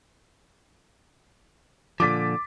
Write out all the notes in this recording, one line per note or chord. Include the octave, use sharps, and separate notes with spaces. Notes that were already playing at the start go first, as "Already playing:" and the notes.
A#2 D3 F3 D6 A6 B6